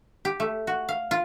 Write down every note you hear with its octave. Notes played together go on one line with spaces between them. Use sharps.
G4
A3
F#4
F5
F4